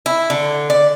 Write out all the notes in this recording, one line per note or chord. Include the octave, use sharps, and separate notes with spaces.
E4
D3
D5